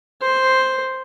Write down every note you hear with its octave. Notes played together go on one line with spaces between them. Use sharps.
C5